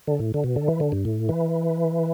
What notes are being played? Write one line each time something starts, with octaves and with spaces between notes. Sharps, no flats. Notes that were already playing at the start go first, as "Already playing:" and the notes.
D3
A2
D3
B2
D3
E3
D3
G2
A2
E3